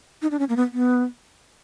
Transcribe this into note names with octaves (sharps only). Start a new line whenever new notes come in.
D#4
D4
C#4
A#3
B3
B3